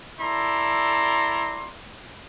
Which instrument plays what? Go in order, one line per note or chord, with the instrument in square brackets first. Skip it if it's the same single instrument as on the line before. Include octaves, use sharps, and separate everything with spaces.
[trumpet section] E4 A4 D5 A#5 C6